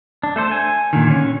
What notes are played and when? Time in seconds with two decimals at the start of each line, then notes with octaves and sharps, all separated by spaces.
0.23 D4
0.36 A3 A4 C5
0.51 G#5
0.93 A#2 D3 D#3
1.11 C#4